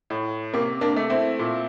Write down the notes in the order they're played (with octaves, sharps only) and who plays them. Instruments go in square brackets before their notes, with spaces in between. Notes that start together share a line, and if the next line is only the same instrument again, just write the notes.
[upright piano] A2
C3 A#3
A#3 D4
A3
C4 E4
A#2